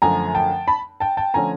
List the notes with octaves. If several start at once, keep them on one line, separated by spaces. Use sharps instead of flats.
F#2 D3 F3 A3 G#5 A#5
G5 A5
A5 B5
G5 A5
G5 A5
D3 F3 A3 C#4 G#5 A#5